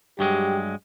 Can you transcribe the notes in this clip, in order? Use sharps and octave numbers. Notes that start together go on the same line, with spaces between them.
G2 F#3 G#3 G4